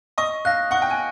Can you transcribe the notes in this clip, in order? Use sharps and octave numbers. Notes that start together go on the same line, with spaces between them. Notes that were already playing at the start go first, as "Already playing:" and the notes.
D#5 C#6
F5 F#6 A#6
F#5 C#6
G5
G#5